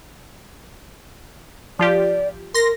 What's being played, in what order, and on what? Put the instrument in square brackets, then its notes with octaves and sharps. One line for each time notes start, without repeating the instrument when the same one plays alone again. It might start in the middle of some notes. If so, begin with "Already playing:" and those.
[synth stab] F3 F4 G4 [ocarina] D5
[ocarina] A#4 [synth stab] C6 A#6